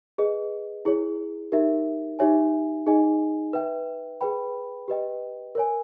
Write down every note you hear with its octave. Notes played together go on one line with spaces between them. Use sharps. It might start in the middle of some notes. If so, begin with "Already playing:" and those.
G#4 B4 D#5
E4 G#4 C#5
D#4 G4 A#4 E5
D#4 G4 C#5 E5 G#5
D#4 G#4 D#5 G#5
B4 E5 G5
G#4 B4 G5 B5
G4 B4 D#5 G5
A#4 C#5 G#5